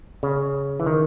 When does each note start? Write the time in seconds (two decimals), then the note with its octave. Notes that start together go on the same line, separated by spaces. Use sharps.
0.23 C#3
0.80 E3
0.86 D#3